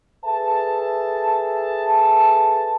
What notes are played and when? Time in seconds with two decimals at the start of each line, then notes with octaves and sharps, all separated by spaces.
0.25 G#4 A4 B4 E5 A5